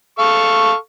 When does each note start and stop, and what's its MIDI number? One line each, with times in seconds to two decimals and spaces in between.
0.19 0.74 69
0.19 0.74 77
0.19 0.74 85